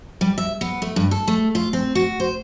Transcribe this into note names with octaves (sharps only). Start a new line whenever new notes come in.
G3
E5
B3
A3
G2
A4
A3
F4
C4
F#4
C5